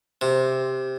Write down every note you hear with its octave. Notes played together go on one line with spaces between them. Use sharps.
C3